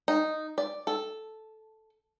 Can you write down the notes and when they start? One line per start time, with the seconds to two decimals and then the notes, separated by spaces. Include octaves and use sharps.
0.08 D#4
0.58 D5
0.87 A4